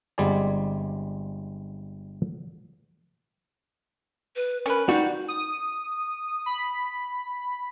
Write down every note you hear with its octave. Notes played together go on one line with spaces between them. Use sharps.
G1 G3 G#3 C4 D5 G#5
B4
C#4 A#4 B4
G3 D#4 F#4
D#6
B5